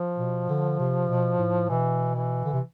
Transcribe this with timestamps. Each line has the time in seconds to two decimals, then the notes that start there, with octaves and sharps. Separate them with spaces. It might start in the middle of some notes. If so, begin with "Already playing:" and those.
Already playing: F3
0.18 B2
0.49 D3
0.79 C3
1.09 B2
1.39 A2
1.69 B2 E3
2.15 E3
2.45 D3
2.53 C3